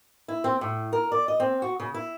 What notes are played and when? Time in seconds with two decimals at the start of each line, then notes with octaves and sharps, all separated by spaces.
0.28 E4
0.44 C4
0.61 A2
0.93 A#4
1.12 D5
1.28 D#5
1.40 C4
1.62 F#4
1.80 C#3
1.94 E4